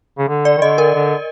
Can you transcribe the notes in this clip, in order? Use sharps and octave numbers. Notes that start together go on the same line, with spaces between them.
C#3
D3
D5
D#3
D3 D#5
A#4
D3